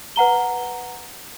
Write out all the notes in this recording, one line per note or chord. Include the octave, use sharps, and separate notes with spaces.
B4 F#5 A#5 G7